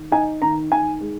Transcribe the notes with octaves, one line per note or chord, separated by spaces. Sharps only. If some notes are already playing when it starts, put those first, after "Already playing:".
Already playing: D#3
D#4 G#5
D#3 A#5
D#3 G#5
G#3